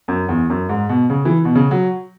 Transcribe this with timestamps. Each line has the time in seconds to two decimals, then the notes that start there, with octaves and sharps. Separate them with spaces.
0.08 F#2
0.29 E2
0.50 F#2
0.69 G#2
0.89 B2
1.10 C#3
1.25 E3
1.45 B2
1.55 C#3
1.71 F#3